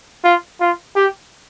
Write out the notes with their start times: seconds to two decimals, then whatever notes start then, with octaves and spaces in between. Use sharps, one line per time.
0.24 F4
0.60 F4
0.96 G4